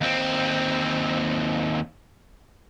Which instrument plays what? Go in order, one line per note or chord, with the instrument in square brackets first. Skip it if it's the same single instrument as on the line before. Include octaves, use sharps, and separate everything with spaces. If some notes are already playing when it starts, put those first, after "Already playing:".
[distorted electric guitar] D#2 C4